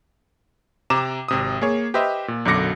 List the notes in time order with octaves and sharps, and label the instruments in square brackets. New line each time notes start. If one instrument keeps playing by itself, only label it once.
[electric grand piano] C3 A#5 D6 E7
G#1 C3 D#6
A#3 G#4 C#5
G4 B4 C5 D#5 E5
A#2
B1 F#2 D3 D6 A#6 C#7